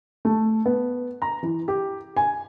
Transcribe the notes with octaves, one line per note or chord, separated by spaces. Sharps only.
A3
B3
A#5
E3
G4
G#5